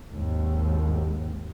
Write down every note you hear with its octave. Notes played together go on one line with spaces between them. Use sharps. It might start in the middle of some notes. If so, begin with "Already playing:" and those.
G#1 D#2 G#2